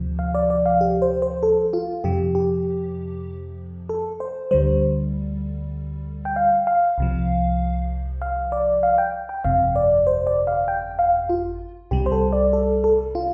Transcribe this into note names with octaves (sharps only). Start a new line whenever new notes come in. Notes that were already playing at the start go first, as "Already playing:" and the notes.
Already playing: D2 C3 F3
F5
D5
D5
F5
G4
C5
C5
A4
F4
F2 C3 F3 G4
G4
A4
C5
D2 D3 G3 C5
G5
F5
F5
C2 C3 F3
F5
D5
F5
G5
G5
G1 F2 C3 F5
D5
C5
D5
F5
G5
F5
F4
C2 C3 G3 G4
C5
A4
D5
A4
A4
F4